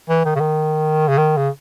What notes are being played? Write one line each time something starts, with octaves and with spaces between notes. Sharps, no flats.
E3
D#3
C#3
D#3
C#3
D#3
C#3